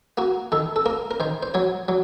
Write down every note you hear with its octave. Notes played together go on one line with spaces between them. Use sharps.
A#3 F#4
D#3 A4
A4
A#3 A#4
A#4
D#3 C5
C5
F#3 C#5
F#3